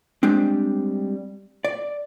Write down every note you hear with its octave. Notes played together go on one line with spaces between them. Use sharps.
G3 G#3 C4 D4
D5